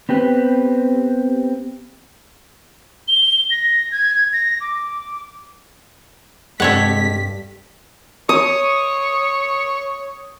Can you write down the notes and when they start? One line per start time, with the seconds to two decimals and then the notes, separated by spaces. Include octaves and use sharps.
0.09 B3 C4 G4 B4
3.08 G7
3.51 A#6
3.92 G#6
4.33 A#6
4.61 D6
6.60 G2 C3 G#3 A4 C#5 F#5 B6
8.29 C#5 D#6